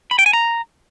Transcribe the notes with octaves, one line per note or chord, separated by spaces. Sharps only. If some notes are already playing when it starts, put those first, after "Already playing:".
B5
G5
G#5
A#5